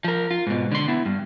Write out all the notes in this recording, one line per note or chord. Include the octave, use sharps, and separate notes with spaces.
F3 A#4
F4
G#2 B2
D3 C6
B3 E4
G2